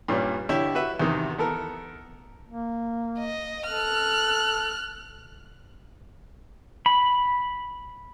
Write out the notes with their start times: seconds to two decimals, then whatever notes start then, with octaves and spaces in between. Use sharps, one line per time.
0.08 G2 A#2 G3 C#4
0.49 D3 E4 G4 C#5
0.75 F#4 B4 E5
1.00 E2 C3 D#3
1.38 B3 A4 A#4
2.49 A#3
3.19 D#5
3.68 A4 F6 F#6
6.86 B5